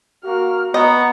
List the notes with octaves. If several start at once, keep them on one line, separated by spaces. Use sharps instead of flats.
A#3 F#4 F6
B3 D#5 A#5 C#6